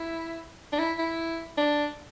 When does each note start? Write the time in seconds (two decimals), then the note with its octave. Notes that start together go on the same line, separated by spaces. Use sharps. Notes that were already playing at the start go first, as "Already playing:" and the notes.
Already playing: E4
0.72 D4
0.79 E4
0.98 E4
1.57 D4